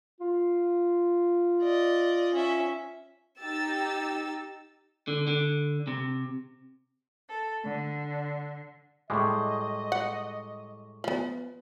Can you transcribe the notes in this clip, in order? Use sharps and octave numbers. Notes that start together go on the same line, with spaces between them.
F4
D5 D#5
C#4 E5
D#4 G4 E6 A6
D3
D3
C3
A4
D3
A2 G3 G#3 D#5 C#6 D6
F#5
F3 B3